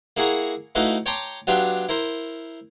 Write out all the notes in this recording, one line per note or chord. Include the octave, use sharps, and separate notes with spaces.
A#3 E4 G#4 F#5 A#5 C#6
A3 D#4 E4 F#4 B4 F5
C#5 G5 A5 A#5 C6 D6
F#3 B3 D4 F4 G4 E5
E4 A#4 C5